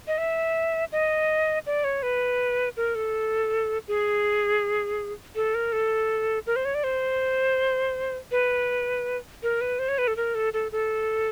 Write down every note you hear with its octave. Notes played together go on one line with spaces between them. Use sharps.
D#5
E5
D#5
D5
C#5
B4
A#4
A4
G#4
A4
A#4
A4
A#4
C5
C#5
D5
C5
B4
A#4
B4
C5
C#5
B4
A4
A#4
A4
A4
A4